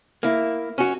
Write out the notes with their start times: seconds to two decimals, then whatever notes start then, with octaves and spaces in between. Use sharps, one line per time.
0.23 A#3 E4
0.78 C#4 F#4